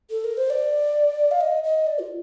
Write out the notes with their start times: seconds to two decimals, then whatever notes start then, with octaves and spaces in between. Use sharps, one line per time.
0.10 A4
0.24 A#4
0.37 C5
0.50 D5
1.31 F5
1.41 D#5
1.64 D#5
1.87 D5
1.99 F4